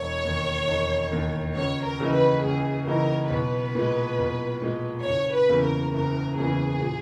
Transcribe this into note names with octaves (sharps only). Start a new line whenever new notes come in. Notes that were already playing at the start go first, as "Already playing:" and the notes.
Already playing: E1 C#5
D#2 D#3
E1
D#2 D#3
C#2 C#5
A#4
C#3 E3 A#3 D#4
B4
C#2 G#4
C#3 E3 A#3 D#4 A#4
B1 B4
A#2 G#3
B1
A#2 G#3
F#1 C#5
B4
E2 C#3 E3 A#3
A#4
F#1 A#4
E2 C#3 E3 A#3 G#4
A#2